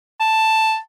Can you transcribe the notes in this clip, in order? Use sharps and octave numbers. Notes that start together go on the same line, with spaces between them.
A5